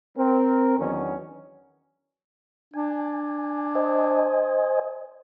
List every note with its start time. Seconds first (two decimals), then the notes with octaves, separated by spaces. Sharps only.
0.17 C4 A#4
0.79 E2 D#3 F#3 B3 C#4 D4
2.74 D4 G#5
3.75 C5 D#5 G#5